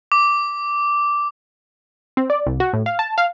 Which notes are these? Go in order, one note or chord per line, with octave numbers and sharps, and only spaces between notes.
D6
C4
D5
C2
F#4
A2
F5
A5
F5